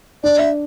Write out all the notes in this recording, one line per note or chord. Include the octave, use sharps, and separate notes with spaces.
D4 D5
E5